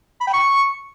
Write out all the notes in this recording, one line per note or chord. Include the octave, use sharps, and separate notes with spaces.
B5
G5
C#6